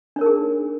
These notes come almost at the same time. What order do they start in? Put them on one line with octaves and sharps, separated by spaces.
D4 C#5 A#4 D#4 G#4